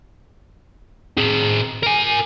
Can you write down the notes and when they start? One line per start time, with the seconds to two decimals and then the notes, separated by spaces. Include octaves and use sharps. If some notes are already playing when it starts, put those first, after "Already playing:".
1.18 C4 G#4
1.83 A#4 G#5